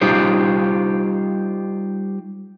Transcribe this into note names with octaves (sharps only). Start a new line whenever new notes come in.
G3 D#4 F4 G4 C5